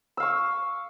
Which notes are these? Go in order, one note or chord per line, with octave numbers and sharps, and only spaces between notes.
F5 C#6 E6